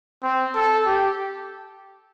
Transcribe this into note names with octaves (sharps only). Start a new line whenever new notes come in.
C4
A4
G4